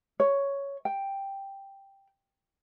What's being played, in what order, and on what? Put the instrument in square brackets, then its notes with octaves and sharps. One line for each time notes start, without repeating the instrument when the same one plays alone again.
[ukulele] C#5
G5